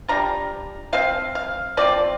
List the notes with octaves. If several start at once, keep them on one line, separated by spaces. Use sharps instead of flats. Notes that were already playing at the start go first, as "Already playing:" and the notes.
G3 D4 F4 A#5
F3 C4 F4 F5
F5
F3 C4 F4 D5